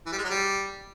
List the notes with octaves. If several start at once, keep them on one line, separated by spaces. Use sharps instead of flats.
E3
G3
G#3
F#3
G3